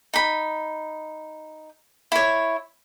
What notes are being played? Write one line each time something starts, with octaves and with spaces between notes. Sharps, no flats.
D#4 B5
E4 C#5